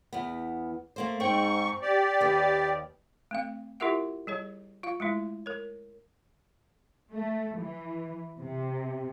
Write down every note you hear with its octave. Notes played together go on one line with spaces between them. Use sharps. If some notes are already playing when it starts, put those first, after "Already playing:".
E2 B3
A3 A#3 C5
G#2 C4 G5 C#6
G4 D5
D#2 B4
A3 C4 F5
E4 F4 G4 A#4 E5 F#5
G3 G#4 C#5
F4 F5
G#3 A3 E4
A#4 C#5
A3
E3
C3